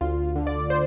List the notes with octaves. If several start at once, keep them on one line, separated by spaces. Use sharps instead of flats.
D2 F4
D3
D5
C5